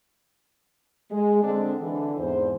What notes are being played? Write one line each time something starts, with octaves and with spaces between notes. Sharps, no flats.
G#3
D3 C4 D4
D3 E3
E2 G#2 C5